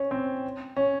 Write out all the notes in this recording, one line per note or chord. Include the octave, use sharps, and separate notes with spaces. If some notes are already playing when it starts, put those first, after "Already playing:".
Already playing: C#4
C4
C#4